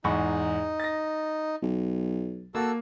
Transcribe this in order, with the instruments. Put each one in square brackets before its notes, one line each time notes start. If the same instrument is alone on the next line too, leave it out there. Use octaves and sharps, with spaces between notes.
[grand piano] E2 G#2 C#6 [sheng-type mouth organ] D#4
[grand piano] A6 A#6
[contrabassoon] B1
[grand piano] A#3 [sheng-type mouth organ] F#4 A4 E6